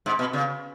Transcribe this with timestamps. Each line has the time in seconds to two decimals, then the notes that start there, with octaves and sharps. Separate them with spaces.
0.06 G#2
0.19 B2
0.33 C#3